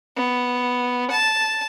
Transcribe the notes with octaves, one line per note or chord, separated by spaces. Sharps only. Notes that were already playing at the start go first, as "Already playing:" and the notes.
B3
A5